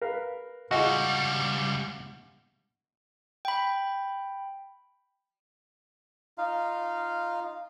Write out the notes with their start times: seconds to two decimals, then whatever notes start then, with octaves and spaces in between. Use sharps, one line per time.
0.02 A#4 B4 F5
0.71 C#2 G3 F4 F#4 G#4 D#5
3.45 G5 B5
6.38 D#4 F4 F5